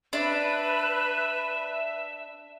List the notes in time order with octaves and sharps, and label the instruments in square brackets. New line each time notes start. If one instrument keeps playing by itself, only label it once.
[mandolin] D4 [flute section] B4 [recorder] E5